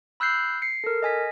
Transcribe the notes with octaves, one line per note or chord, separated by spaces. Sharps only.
B5 E6 F#6 G6 C7
C7 C#7
A4 A#4
D#5 G#5 B6